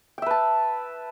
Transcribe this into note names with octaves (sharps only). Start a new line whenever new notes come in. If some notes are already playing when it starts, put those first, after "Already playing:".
B4 E5 G5 A5